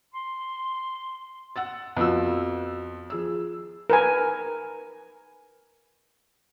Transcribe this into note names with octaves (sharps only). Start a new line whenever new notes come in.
C6
F#5 E6 A6
F2 B3 F#4 E6
F3 G#4 E6
A#4 B4 G#5